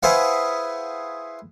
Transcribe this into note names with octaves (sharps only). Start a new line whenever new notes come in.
E4 G#4 B4 C5 F5 F#5